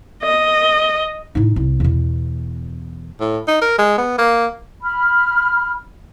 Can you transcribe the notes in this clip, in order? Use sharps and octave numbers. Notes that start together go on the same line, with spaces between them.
D#5
A2 D#4
C2
E2 B2
A2
D#4
A#4
G#3
B3
A#3
B5 F6